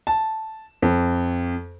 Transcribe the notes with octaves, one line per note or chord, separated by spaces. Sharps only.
A5
F2